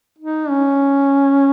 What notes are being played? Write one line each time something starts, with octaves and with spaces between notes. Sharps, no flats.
D#4
C#4